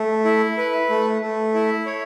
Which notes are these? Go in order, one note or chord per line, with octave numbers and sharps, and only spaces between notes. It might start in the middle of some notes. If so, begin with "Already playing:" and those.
Already playing: A3
E4
B4
A3
A3
E4
C#5